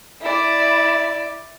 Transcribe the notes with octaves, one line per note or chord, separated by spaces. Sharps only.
E4 D5